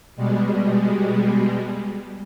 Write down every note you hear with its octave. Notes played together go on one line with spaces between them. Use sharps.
B2 G3 G#3